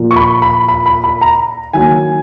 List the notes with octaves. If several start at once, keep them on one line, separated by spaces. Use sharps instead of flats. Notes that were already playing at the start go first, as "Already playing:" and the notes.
Already playing: A#2 F3 A#3
C#6
B5
B5
B5
B5
B5
A#5
D#3 F#3 A#3 G#5